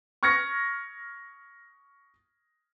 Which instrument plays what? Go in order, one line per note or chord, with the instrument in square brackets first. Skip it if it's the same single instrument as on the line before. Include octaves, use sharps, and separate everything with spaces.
[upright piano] C#6 F6 G#6 A#6 C#7